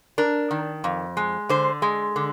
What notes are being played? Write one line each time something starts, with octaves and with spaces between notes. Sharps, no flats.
D4 A#4
D#3
F2
G#3
D3 C5
G#3
D3